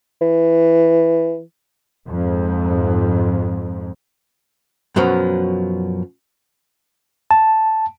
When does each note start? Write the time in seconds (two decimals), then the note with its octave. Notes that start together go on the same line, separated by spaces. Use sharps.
0.22 E3
2.07 F2 G#2
4.96 F#2 B2 F3 F#3
7.31 A5